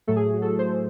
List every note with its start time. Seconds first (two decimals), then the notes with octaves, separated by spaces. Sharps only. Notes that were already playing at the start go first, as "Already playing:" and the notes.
0.07 A2 F#3 A3 A4
0.16 G#4
0.33 F#4
0.42 A4
0.59 C5